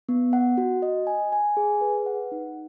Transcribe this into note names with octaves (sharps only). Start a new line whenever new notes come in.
B3
F#5
F#4
D#5
G#5
G#5
G#4
B4
F#5
D#4